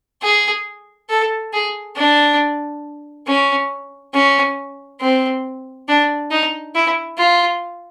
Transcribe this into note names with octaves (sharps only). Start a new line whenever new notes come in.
G#4
A4
G#4
D4
C#4
C#4
C4
D4
D#4
E4
F4